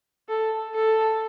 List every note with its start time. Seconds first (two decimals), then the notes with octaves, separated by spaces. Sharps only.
0.29 A4
0.75 A4